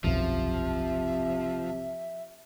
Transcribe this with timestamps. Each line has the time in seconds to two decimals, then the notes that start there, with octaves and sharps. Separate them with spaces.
0.04 E1 B1 F#2 C3 F3 E5